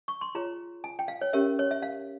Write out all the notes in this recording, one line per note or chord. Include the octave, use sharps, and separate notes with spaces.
C#6
C6
F4 G#4 C#5 A#5
G#5
G5
F5
C#5
C#4 G4 A#4 C#5 E5
C#5
E5
F5